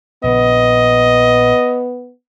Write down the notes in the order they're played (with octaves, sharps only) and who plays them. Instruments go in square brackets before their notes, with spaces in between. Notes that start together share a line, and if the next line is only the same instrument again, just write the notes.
[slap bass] A#1 C#3 [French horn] B3 [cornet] D#5